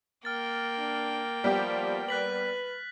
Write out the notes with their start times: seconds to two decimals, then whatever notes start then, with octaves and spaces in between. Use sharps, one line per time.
0.25 A#3 G5 F6 A6
0.78 D4
1.44 F3 G3 B3 G4
2.09 B4 F#6 B6 F#7